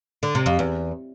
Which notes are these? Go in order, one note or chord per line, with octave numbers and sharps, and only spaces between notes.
D3
C3
F2
E2